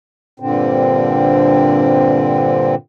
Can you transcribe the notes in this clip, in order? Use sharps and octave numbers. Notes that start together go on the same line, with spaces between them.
G2 A#2 D3 C4